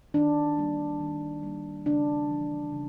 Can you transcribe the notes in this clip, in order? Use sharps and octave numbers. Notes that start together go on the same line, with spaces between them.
D#3 D4
G3 A#3
D#3
G3 A#3
C#3 D4
E3 G3
C#3